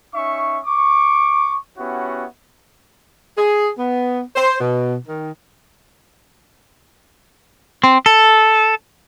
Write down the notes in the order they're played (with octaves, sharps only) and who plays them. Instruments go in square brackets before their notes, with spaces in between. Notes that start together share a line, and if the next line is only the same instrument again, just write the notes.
[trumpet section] C#4 D#4 E5 C#6
C#6 D6
B3 C#4 E4 F#4 G4 C#5
[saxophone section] G#4
B3
C5
B2
D#3
[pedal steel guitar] C4
A4